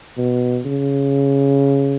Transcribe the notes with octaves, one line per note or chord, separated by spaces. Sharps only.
B2
C#3